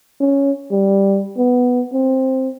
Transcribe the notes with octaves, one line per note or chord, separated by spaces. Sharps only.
C#4
G3
B3
C4